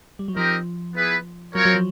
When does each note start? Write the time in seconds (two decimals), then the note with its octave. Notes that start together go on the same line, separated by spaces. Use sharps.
0.19 G3
0.28 F#3
0.36 F3 C4 D#4 G4 A#4 D#5
0.95 B3 E4 G#4 B4
1.55 F#3 C4 F4 A#4 C#5
1.65 F#3
1.75 F3